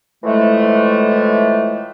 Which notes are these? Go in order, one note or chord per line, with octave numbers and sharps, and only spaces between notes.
A2 E3 F3 G#3 A3